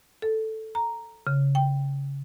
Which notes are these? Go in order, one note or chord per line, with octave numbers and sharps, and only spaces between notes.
A4
A#5
C#3
G5